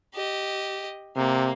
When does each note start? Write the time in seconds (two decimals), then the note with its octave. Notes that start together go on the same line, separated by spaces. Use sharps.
0.14 G4 D#5
1.16 C3 A#3